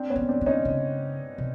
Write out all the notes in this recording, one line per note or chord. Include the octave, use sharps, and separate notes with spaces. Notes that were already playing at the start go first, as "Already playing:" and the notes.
Already playing: C4 D4
B3 C#4
D#3
C4 D4
D3
C#4 D#4
C#3
C3